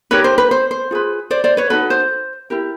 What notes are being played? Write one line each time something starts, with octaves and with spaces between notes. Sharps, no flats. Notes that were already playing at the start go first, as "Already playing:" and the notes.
D#4 G4 A#4 B4 C#5
C5
B4
C5
C5
F4 G#4 B4
C5 D5
C5 D5
B4 C#5
D#4 F#4 A4 B4
C5
E4 G4 A#4